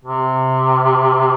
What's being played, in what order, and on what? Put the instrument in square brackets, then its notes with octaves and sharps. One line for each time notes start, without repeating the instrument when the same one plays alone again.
[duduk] C3